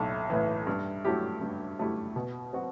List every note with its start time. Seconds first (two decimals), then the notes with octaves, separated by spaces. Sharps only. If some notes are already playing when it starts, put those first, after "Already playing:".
Already playing: B1 A2
0.30 A2 E3
0.67 G2
1.05 F#3 A3 E4 G4
1.41 G2
1.79 F#3 A3 E4 G4
2.16 B2
2.53 F#3 C4 F#4